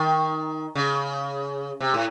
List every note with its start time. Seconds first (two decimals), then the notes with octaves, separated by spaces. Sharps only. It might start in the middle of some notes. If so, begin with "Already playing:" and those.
Already playing: D#3
0.75 C#3
1.80 C3
1.94 A2